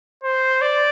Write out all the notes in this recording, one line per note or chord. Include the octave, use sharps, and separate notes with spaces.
C5
D5